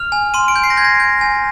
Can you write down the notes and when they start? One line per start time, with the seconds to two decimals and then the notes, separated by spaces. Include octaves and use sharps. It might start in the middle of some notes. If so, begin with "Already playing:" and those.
Already playing: F6 F7
0.12 G#5
0.34 C6 D#7
0.48 D7
0.56 G6
0.64 C7
0.70 A#6
0.77 G6 G#6
0.85 A#6
1.00 G6
1.21 G#5